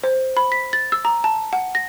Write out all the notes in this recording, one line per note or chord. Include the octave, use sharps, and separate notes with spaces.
C5
B5
B6
A6
E6
A#5
A5
F#5
A#6